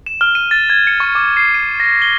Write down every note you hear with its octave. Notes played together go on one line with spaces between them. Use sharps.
E7
F6
D#7
A6
G#6
C#7
C#6
D6
C7
D#7
A#6
G7